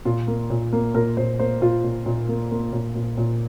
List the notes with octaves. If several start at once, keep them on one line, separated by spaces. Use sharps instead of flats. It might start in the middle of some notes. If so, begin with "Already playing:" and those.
A#2 F4
A#3
A#2
A#3
A#2 A#4
A#2 C5
A#3 C5
A#2 F4
A#2
A#2
A#3
A#3
A#2
A#2
A#2